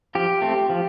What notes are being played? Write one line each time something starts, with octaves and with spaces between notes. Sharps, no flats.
F3 G4
A3 C4
F3